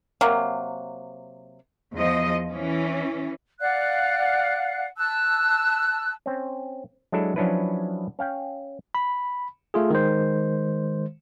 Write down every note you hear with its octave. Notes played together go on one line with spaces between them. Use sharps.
C3 F#3 A#3
E2 F3 D#5
E3 C#4
D5 F5 F#5 F#6
A5 E6 F#6
C4 C#4
F#3 G#3 D4 E4 A4
F3 F#3 C#4 D4 E4 B4
C#4 F5 G5
B5
A3 F4 G#4
D#3 G#3 C5